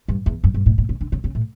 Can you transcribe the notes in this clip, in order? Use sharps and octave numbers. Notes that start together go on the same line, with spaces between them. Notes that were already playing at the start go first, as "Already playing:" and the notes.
G2
E2
F#2
G2
A2
A2
C#3
D3
C#3
C#3
A2